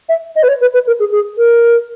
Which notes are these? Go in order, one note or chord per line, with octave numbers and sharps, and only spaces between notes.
E5
D#5
B4
C#5
B4
B4
A#4
G#4
G#4
A#4